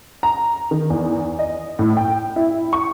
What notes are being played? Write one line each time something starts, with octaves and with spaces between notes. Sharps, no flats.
A#5
D#3
E2
D#5
A2
G5
E4
C#6